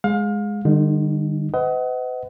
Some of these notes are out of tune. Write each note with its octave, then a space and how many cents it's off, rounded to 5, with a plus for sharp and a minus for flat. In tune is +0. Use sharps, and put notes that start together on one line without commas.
G#3 +0 F5 +30
D3 +45 G3 +25 D#4 +0
B4 +45 D#5 +30 F#5 +25